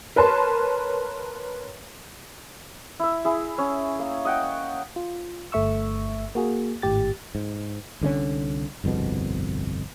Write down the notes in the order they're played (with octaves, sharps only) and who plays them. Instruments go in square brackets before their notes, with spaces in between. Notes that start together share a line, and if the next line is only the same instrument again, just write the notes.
[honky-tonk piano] A#4 B4 C#5 A5 C6
[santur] E4 E5
E4 G#4
C#4
A#3
D#5 F#5 G5
[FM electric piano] F4
G1 A3 E5 C#6 E6
A#3 F#4 G#4
G#1 A2 G4 A6
[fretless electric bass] G#2
C2 D3 G#3 C#4
G1 C2 F2 B2